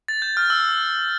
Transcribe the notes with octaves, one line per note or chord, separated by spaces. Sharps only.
A6
G6
F6
E6